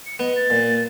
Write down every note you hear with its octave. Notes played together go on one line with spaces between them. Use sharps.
C#7
B3 D#5
A6
A#2